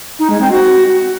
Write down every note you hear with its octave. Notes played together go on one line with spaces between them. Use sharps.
D#4
G#3
C4
F#4